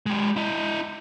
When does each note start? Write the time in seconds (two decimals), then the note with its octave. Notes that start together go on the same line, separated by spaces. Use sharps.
0.06 G#3 G4
0.36 E4 D#5